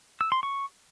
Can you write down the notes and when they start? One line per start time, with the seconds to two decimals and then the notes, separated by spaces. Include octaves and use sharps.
0.21 E6
0.32 C6
0.43 C#6